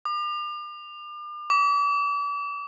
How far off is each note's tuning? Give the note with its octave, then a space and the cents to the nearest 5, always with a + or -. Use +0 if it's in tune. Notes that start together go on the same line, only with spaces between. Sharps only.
D6 +40
D6 -40